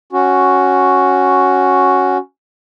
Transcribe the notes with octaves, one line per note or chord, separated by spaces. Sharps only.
C#4 F#4